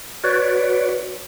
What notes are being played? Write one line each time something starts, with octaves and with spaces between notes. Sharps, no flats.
F#4 B4 C#5 D5